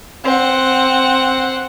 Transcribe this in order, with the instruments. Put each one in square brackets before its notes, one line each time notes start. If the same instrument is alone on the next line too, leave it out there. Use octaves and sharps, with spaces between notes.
[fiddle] C4 F#5